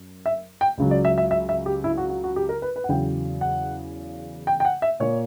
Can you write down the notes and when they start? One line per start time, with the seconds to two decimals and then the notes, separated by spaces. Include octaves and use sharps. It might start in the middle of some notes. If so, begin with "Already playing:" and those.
Already playing: F#2
0.26 E5
0.61 G5
0.78 C#2 C#3 F#3
0.91 D5
1.05 E5
1.18 E5
1.31 E5
1.49 E5
1.66 G4
1.84 E4
1.97 F#4
2.10 F#4
2.24 F#4
2.36 G4
2.49 A#4
2.62 B4
2.76 B4
2.84 F#5
2.89 E2 C#3 F#3 G5
3.41 F#5
4.47 G5
4.60 G5
4.65 F#5
4.82 E5
5.00 A#2 A#3 C#5